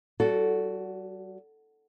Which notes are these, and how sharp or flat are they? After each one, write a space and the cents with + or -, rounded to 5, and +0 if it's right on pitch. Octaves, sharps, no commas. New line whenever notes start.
G3 -40 F#4 +0 A4 +0